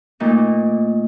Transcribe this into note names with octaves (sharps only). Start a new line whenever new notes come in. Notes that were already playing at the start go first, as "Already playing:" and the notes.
A#2 A3 A#3 D#4 F4 A#4